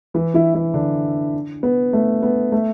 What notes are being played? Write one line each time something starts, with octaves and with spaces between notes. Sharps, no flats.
E3 E4
E3 E4
E3 E4
D3 D4
B3
A3
B3
A3